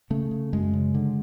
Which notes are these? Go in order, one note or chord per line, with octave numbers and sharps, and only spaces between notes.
C#3 A3
C#3
F#2 G#3
C#3
D3